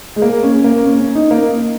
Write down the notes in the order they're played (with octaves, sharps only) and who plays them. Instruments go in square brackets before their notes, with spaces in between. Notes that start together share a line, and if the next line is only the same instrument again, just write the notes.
[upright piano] G#3
A#3
C#4
C#4
A#3
C#4
C#4
D#4
A#3